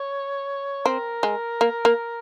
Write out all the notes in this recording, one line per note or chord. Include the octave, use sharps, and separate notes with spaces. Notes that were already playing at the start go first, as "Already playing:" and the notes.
Already playing: C#5
C4 A#4
G#3
A#3
A#3